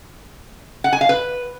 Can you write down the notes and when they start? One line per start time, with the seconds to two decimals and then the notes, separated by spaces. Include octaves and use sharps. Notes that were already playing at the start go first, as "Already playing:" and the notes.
0.84 F#5
0.93 G#5
1.01 F5
1.09 B4